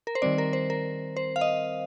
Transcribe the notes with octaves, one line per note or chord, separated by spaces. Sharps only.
A#4
C5
D#3 G3 C4 D5
A#4
C5
A#4
C5
F5
D#5